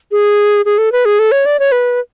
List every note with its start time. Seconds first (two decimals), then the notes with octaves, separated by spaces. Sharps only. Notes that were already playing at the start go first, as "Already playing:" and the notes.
0.12 G#4
0.65 G#4
0.78 A4
0.92 B4
1.05 G#4
1.19 A4
1.32 C#5
1.46 D5
1.59 C#5
1.72 B4